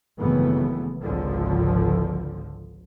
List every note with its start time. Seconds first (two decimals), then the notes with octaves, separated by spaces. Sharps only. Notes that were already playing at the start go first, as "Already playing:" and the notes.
0.18 G#1 F#2 C#3 E3 A3 B3
1.01 G#1 C#2 D3 F3